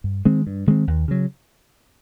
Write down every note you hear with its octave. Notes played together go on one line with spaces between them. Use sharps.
G2
D#3 G#3 C4
G2
D#3 G#3 C4
D#2
C#3 F#3